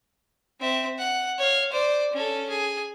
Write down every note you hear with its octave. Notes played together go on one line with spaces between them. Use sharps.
C4 E5
F#5
C#5 F5
C5 D5
C#4 A4
G#4